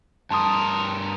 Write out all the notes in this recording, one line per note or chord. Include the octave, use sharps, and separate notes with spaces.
G2 A#4 A5 C6 D#6